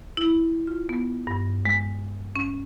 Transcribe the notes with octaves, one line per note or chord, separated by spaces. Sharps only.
E4
F4
B3
G2
G#3
C#4